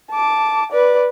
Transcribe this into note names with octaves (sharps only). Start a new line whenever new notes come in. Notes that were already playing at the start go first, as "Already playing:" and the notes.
A5 D6
B4 D5